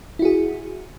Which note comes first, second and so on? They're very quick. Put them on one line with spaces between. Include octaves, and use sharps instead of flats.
E4 F#4 G#4